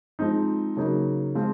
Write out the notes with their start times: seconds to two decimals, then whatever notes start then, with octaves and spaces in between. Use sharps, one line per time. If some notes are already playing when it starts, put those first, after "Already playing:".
0.19 F3 G#3 C4 D#4
0.77 C#3 F#3 A#3 D#4
1.35 F3 G#3 C4 F4